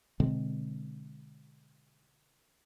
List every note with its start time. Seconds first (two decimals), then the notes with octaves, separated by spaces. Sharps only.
0.20 B2 D3 G#3 C4